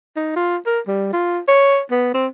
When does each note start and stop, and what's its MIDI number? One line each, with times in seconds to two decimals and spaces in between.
0.16 0.31 63
0.36 0.57 65
0.66 0.80 70
0.87 1.09 55
1.13 1.39 65
1.48 1.81 73
1.91 2.12 59
2.14 2.27 60